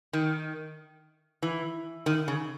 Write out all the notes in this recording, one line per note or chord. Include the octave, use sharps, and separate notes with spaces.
D#3
E3
D#3
C#3